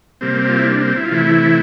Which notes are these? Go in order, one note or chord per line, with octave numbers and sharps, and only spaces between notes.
C3 G3 A#3 C4
F4
E4
D4
C4
E4
F4
C3 E3 A3 E4